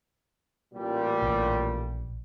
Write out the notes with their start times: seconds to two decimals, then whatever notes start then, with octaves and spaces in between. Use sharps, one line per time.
0.74 A1 A#2 G3
1.22 A#1